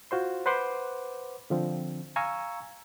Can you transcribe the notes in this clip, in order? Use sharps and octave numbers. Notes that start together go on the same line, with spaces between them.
F4 F#4 C5 C6
B4 C5 F#5 C6 D6
D3 F3 C4
F5 G#5 A#5 C#6 E6